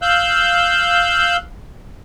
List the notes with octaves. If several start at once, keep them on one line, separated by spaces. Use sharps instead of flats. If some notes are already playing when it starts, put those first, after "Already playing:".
F5 E6 F#6 G6